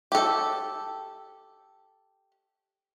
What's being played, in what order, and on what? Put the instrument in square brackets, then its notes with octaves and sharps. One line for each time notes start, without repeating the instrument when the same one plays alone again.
[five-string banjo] G4 A4